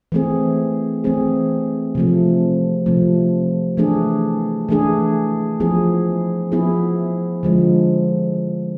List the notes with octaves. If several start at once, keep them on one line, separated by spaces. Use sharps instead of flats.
E3 A3 C4 G#4
E3 A3 C4 G#4
C3 F3 A3
C3 F3 A3
E3 A3 D4 G#4
E3 A3 D4 G#4
F3 B3 E4 G#4
F3 B3 E4 G#4
D3 F3 G#3